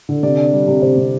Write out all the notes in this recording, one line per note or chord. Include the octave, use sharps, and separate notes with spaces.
D3
C3 D5
D4
G3
C3
C3 C5
C3